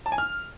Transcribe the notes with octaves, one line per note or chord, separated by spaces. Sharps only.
A5
G#5
F6